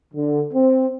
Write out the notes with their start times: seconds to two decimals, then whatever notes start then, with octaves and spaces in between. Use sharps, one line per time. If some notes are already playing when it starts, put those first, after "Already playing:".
0.14 D3
0.53 C4